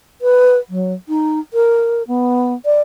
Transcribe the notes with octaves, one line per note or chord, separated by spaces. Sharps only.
B4
F#3
D#4
A#4
B3
D5